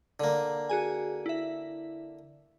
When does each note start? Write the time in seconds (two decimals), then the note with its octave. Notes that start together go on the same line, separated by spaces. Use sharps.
0.20 D3 A#3
0.69 F#4 G#4 G#5
1.26 E4 E5